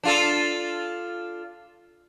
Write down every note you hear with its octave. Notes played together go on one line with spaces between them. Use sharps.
D4 F4 A4